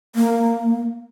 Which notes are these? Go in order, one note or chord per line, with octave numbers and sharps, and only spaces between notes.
A#3